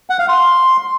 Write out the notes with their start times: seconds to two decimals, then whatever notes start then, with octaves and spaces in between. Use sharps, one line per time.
0.10 F#5
0.19 F5
0.29 C6